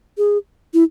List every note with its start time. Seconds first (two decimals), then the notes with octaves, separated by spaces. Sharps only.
0.18 G#4
0.74 E4